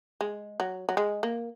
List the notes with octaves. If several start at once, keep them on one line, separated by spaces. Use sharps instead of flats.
G#3
F#3
F#3
G#3
A#3